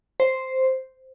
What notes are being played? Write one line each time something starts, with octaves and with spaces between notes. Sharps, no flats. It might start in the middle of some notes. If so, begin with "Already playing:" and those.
C5